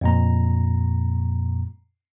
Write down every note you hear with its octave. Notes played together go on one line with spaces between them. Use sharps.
F2 A#2 A#5